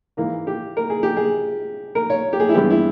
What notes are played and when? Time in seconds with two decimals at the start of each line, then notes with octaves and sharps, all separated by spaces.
0.17 G#2 E3 A#3
0.47 G4
0.77 A#4
0.90 G#4
1.03 G4
1.17 G#4
1.95 A#4
2.10 C#5
2.33 G4
2.40 G#4
2.49 E4
2.54 G2 E3 G#3 B3 G4
2.70 E4